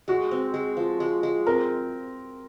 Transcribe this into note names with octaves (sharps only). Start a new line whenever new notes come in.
G#3 F#4
C4
G#3
F3
G#3
G#3
C4 A#4